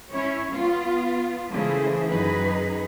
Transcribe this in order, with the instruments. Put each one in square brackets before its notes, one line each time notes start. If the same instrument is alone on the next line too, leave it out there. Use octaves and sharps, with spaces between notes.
[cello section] C#4 E4 C#5
B3 F4
C#3 E3 A3 E4 G#4 C5
F#2 D#3 D#4 G#4 B4